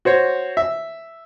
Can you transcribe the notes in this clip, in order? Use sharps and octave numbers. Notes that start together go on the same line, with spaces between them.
F#4 C5 C#5
E5